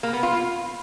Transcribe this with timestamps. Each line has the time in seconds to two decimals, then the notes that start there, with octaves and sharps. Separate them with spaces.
0.03 A#3
0.13 B3
0.23 F4